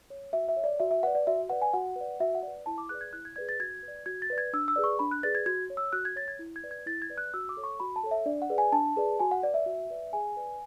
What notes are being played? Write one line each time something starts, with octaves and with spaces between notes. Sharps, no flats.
C#5
F#4 E5
E5
C#5
D5
F#4 E5
E5
B4 D5 F#5
D5
F#4 E5
B4 D5 F#5
G#5
F#4 F#5
B4 D5
F#4 E5
F#5
B4 D5
E4 A5
D6
G#4 B4 D5 F#6
G#6
E4 F#6
G#6
G#4 B4 D5 G#6
A6
F#4 G#6
B4
D5
F#4 G#6
A6
B4 D5
G#6
D4 E6
E6
G#4 B4 D5
C#6
D4 B5
F#6
G#4 B4 D5 A6
G#6
F#4 G#6
C#5
E6
F#4 F#6
G#6
C#5 A6
G#6
E4
G#6
B4 D5
G#6
E4 A6
G#6
B4 D5
F#6
F#4 E6
D6
A4 C#5
C#6
F#4 B5
A5
A4 C#5
E5
D4 D5
F#5
G#4 B4 D5
G#5
D4 A5
G#4 B4 D5
F#4 G#5
F#5
B4 D5
E5
F#4
B4 D5
G#4 G#5
B4 D5